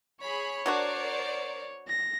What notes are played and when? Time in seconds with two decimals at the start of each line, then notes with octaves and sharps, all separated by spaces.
0.22 G#4 C#5 B5
0.66 F#3 D4 F#4 A#4 C5 D5
1.88 A#6